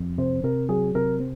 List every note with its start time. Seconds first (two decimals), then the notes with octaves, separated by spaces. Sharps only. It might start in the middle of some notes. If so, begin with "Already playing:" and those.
Already playing: F2
0.18 C3 C5
0.43 C3 A#4
0.69 F#3 G#4
0.95 C3 A#4
1.20 C4